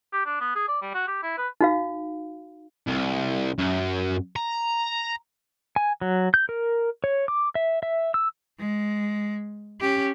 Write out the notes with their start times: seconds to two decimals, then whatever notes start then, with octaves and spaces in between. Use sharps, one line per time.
0.13 G4
0.26 D4
0.41 B3
0.56 G#4
0.68 D5
0.82 G3
0.95 F#4
1.08 G4
1.23 E4
1.38 B4
1.61 D#4 F#4 F5
2.87 C2
3.58 F#2
4.36 A#5
5.76 G#5
6.01 F#3
6.34 G6
6.49 A#4
7.04 C#5
7.28 D6
7.55 E5
7.83 E5
8.14 E6
8.59 G#3
9.81 C#4 G4